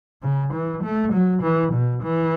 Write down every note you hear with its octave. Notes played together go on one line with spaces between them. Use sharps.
C#3
E3
A3
F#3
E3
B2
E3